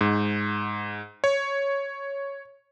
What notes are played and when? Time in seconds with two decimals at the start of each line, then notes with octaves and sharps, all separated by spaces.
0.01 G#2
1.24 C#5